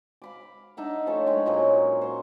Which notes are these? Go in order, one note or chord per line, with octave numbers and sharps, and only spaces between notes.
F5 B5 D6
D4 D#4 E5 F#5
F3 A3 C#4 A4
G#3 C#5 G5
A#2 F#3 G#4 C#5
C5 C#6